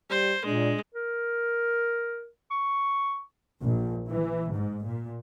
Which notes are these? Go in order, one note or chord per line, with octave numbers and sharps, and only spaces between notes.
G3 C5
A#2 G#3 D4
A#4
C#6
A#1
E3
G#2
A#2